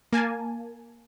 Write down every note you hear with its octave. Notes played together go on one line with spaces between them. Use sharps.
A#3 G#5 A5